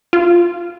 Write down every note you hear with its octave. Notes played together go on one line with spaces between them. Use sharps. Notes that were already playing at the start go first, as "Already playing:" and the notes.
F4